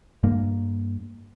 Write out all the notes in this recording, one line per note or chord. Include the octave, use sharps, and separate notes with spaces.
G2 A#3